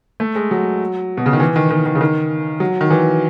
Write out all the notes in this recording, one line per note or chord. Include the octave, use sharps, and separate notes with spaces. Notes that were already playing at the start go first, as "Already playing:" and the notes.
A3
G#3
F#3
B2
C#3
D#3
E3
D#3
D#3
D#3
C#3
D#3
F#3
D#3
E3